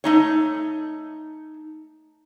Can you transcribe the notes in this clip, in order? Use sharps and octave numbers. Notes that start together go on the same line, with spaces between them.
A3 D#4 C#5